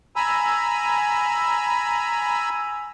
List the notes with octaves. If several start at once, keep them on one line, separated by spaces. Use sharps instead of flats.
G#5 A#5 B5 E6